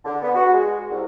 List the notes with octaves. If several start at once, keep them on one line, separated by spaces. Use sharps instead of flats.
D3
B3
F#4
G#3
C2